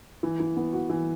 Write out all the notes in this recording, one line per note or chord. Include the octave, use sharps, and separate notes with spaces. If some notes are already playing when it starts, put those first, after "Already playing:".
E3
E3
B3
F#4
E3